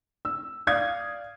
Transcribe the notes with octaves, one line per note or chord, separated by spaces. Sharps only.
E6
D5 F5 D#6 G#6